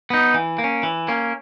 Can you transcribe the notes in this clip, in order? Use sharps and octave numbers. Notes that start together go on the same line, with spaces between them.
B3 D#4
E3
A#3
C#4
E3
A#3 C#4